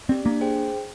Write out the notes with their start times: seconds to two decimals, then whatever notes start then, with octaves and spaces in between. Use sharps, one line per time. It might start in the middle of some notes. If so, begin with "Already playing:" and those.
0.09 C4 G4 D5
0.25 A#3 D4
0.41 G#4 C5 G5